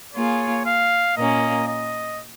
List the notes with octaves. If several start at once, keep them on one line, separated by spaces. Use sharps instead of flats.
A#3 F4 G#4 C#5
F5
A#2 A#3 C#4 D#5
D#5